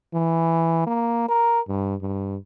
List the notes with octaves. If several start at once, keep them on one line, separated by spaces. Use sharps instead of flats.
E3
A#3
A#4
G2
G2